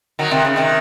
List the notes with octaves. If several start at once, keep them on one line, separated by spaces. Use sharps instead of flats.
D#3 F#3
C3 D#3
C#3
C3 D#3